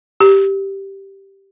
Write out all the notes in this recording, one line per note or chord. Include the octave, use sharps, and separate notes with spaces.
G4